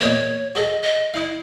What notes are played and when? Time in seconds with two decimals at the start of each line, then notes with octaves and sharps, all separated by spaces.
0.01 E2 A#2 C#5 D#5
0.55 F#4 G#4 A4 D#5
0.82 D#5
1.14 E4 D#5 F5